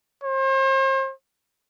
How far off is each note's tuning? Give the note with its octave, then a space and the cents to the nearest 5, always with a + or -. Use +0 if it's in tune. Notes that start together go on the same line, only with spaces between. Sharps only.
C5 +40